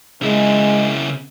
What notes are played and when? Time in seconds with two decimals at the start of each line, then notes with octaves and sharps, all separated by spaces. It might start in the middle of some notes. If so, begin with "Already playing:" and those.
0.23 C#3 G#3 E4